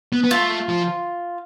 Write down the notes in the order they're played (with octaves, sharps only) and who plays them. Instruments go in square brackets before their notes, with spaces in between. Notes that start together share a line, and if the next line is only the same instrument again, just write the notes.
[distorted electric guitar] B3
B3
[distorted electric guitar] A3 [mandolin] F4
[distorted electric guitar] F3